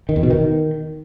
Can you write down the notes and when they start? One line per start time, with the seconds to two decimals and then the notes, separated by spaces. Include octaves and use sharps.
0.09 D#3
0.16 E2
0.23 B2
0.30 D#3